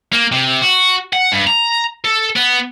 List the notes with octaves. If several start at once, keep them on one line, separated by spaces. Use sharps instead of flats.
A#3
C3
F#4
F#5
G2
A#5
A4
B3